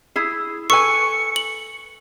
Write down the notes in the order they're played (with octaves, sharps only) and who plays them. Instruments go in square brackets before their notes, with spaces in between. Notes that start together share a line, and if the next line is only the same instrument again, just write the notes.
[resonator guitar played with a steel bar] E4 G#4
[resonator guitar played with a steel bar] A4 B4 G#5 [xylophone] C#6 [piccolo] C#7
[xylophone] F#7